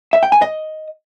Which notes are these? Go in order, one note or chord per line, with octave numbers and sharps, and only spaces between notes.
E5
G5
G#5
D#5